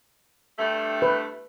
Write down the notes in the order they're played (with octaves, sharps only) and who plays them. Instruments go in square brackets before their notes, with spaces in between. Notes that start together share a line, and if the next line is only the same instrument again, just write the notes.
[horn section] G2 A3
[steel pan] B4